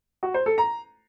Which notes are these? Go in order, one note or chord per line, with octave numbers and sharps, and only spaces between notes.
F#4
C5
A4
A#5